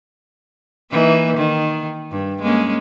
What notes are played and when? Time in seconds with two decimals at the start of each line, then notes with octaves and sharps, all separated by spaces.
0.91 E3 A#3 D#4
1.37 D#3
2.12 G2
2.42 G#3 A#3 C#4